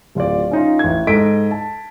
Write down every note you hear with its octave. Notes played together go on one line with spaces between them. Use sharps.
D1 F4 D5
C#4 D#4 F4
A1 G#6
G#2 A4 D#5 B6 D7
A5